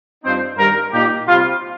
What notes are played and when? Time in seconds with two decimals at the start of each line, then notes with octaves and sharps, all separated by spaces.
0.24 G2 F3 C4 D#4 C5
0.58 G2 D#3 G3 A#4
0.92 A#2 A#3 D#4 G4
1.27 C3 G3 C4 F4